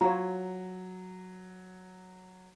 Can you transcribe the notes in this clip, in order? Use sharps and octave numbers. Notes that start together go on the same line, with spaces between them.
F#3 F4 F#4 C#5 A#5